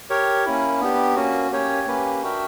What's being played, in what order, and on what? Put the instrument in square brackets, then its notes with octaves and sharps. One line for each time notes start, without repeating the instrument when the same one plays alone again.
[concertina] G4 A#4 C#5
A#3 C#4 E4
B3 D4 G4
A#3 C#4 F#4
A#3 C#4 G4 C#5 G5
A#3 C#4 G4 B4
D4 F#4 A#4 E5 G5